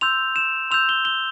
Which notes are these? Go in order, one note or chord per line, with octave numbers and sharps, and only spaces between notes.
C6 E6 G6 F7
E7
C6 E6 G6 F7
G7
G7